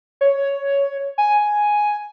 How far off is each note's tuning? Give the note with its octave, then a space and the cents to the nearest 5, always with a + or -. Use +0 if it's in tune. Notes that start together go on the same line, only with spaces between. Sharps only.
C#5 +10
G#5 +5